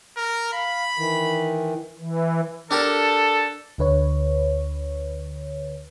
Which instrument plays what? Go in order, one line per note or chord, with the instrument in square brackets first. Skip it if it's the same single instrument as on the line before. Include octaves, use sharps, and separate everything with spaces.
[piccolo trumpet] A#4
[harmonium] F5 [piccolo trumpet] B5
[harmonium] D#3 E3
[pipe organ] E3
[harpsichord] D4 G4 A#4 [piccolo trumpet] A4
[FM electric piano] D2 D3 B4 C#5